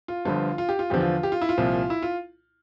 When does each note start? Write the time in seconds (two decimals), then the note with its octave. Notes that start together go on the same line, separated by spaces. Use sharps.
0.08 F4
0.25 G1 G2 D3 F3 F4
0.58 F4
0.69 G4
0.79 F4
0.90 E2 D3 F3 G4
1.01 F4
1.23 G4
1.32 F4
1.41 E4
1.49 F4
1.58 C2 A#2 F3
1.90 E4
2.02 F4